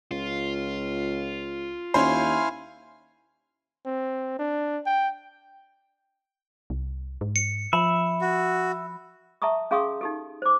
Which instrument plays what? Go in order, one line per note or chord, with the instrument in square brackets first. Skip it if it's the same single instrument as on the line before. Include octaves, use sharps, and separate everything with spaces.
[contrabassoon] C#2 [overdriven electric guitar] F4
[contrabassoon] D#2 [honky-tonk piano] C#4 C5 [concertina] E4 F5 G#5
[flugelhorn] C4
D4
G5
[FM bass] C2
G#2
[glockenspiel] C#7
[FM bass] F3 [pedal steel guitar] E5 [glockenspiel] B5
[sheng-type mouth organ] F#4
[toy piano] E5 A5 A#5 C#6 D#6
C#4 G#4 F5 C6 C#6 D#6
D#4 G4 A4
C5 D6